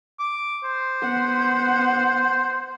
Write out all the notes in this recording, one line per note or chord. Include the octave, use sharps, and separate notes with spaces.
D6
C5
B3 F#5